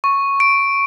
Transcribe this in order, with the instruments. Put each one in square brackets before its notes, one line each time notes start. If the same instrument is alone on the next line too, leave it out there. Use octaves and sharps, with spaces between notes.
[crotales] C#6
D7